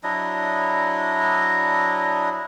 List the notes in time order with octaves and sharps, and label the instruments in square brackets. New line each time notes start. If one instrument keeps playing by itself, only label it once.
[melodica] F#3 D4 E4 D#5